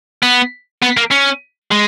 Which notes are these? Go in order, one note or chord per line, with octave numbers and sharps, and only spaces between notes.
B3
B3
A#3
C#4
G#3